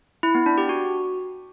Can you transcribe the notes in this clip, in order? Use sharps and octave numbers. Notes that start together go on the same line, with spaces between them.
E4
B3
D4
G4
F#4